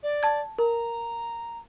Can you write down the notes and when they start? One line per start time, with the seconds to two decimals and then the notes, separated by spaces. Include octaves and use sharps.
0.03 D5
0.23 A5 G#6
0.59 A#4 A#5